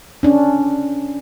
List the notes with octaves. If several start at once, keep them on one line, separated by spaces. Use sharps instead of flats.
C#4 D4